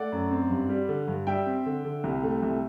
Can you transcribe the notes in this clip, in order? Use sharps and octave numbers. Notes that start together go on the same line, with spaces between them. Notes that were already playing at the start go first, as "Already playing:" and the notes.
Already playing: A3 D5 F#5
F#2
C4
G2
G3
D3
G2
G3 E5 G5
C4
D3
D3
C2
A3
C2